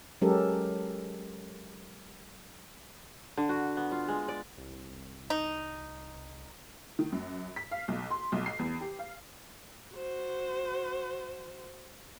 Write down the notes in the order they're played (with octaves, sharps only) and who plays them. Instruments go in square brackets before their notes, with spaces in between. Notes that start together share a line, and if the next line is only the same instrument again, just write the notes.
[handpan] F#3 G#3 C#4 G4 A4 A#4
[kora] D3
F#4
B3
F4
G#3
D5
[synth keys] C2
[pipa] D#4
[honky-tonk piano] D#3
F#2
B6
F5
B1
C6
B1
C7
E2
G4
F5
[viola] F#4 C5